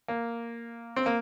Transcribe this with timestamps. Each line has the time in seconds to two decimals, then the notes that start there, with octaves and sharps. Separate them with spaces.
0.08 A#3
0.96 C4
1.06 A#3